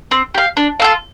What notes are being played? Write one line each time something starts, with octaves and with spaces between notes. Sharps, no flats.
C4
G4 F5
D4
F4 A4 F5